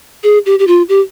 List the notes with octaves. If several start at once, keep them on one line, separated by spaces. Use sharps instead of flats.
G#4
G4
G4
F4
G4